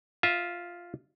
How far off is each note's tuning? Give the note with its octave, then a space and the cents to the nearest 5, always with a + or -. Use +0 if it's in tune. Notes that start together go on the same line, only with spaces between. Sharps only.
F4 +0 E5 -20